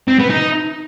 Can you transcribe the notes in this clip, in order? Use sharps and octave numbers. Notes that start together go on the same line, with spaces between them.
C4
B3
D#4